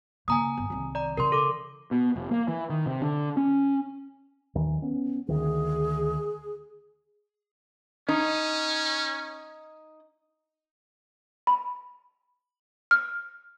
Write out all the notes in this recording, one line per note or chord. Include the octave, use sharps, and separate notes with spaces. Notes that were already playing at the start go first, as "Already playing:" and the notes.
C#3 A#3 G#5 A#5 D#6
G1
C2 D#3
D5 A#5
C#3 E3 A#4 C6
A4 D6
B2
F1
A#3
E3
D#3
C3
D3
C#4
D#2 D#3 E3
B3 C#4
D2 D#3 G#4
C#4 D#4
B5
F6